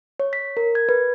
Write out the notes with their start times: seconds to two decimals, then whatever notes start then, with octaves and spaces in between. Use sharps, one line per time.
0.20 C#5
0.33 B6
0.57 A#4
0.75 G#6
0.89 B4